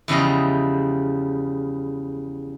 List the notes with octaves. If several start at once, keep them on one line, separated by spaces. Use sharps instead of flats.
E2 C#3 F3 G3 D#5